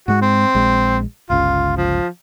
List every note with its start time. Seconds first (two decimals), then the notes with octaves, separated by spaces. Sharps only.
0.08 G#2 G#3 F#4
0.21 C4
0.55 A#1 G#3
1.30 G1 C#2 C#3 F4
1.77 F3